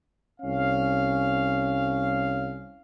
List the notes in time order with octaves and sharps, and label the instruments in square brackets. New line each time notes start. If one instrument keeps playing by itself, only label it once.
[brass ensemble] C2 C#4 F5